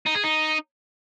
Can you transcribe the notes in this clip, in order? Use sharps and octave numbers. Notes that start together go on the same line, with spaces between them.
D#4
G#4
D#4